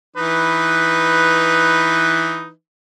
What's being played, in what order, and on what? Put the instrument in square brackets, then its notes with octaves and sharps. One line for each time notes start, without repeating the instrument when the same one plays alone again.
[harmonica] E3 D#4 B4